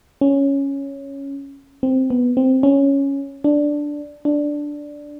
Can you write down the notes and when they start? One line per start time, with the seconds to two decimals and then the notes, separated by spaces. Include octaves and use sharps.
0.21 C#4
1.83 C4
2.10 B3
2.37 C4
2.63 C#4
3.44 D4
4.25 D4